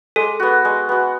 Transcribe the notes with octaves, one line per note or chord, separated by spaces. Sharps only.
G#3 A4
B3 F#4
G#3
B3 F#4